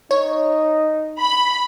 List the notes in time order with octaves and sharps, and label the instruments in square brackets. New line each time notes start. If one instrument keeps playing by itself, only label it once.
[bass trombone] D#4 [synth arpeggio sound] C#5
[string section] B5